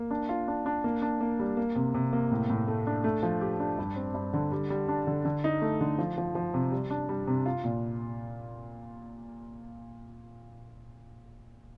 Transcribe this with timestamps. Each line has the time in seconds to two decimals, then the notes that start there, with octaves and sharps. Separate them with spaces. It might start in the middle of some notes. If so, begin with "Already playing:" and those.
Already playing: A#3
0.11 D4
0.29 F4
0.48 D4
0.66 D4
0.84 A#3
1.02 D4
1.21 A#3
1.39 G3
1.57 A#3
1.76 C3
1.94 C3
2.13 A#3
2.31 A2
2.50 A2
2.68 A3
2.87 D4
3.04 A3
3.23 F3
3.41 G4
3.60 D4
3.78 G2
3.96 C4
4.14 G2
4.33 D3
4.52 G3
4.70 G3
4.89 D4
5.07 D3
5.25 D3
5.44 D#4
5.62 A3
5.81 D3
5.98 F3
6.18 F3
6.35 F3
6.54 C3
6.72 G3
6.90 D4
7.09 G3
7.27 C3
7.46 F4
7.64 A#2